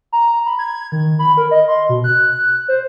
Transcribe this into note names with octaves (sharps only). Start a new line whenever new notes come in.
A#5
B5
G#6
D#3
B5
A#4
D#5
C6
B2
F#6
C5